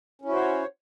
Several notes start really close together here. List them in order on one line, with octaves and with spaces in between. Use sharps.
C#4 E4 F#4 C5 C#5